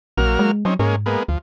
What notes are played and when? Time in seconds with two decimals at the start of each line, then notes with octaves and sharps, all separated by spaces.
0.18 A#1 F#3 A#3 F6
0.39 G#3
0.65 F#3 C4 C#4 D#4
0.79 G#2 G#3 A#3 C#4
1.06 G#3 A#3 B3
1.28 D2 F3